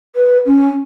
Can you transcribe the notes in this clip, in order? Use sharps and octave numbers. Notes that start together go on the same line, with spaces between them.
B4
C#4